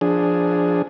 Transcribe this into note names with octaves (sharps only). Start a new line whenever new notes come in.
F3 D4 G#4